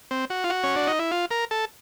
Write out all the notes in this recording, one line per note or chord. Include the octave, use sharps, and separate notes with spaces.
C4
F#4
F4
F#4
C#4
D4
D#4
E4
F4
A#4
A4